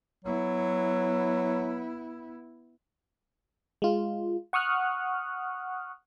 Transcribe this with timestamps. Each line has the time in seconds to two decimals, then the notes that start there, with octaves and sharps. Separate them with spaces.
0.25 F#3 B3 E4
3.82 G#3 F4
4.53 F#5 C#6 D#6 F6 F#6